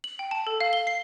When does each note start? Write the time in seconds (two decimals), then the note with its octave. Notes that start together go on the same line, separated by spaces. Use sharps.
0.04 F#7
0.19 G5
0.31 A5
0.47 A4
0.61 F5
0.73 G7
0.87 C7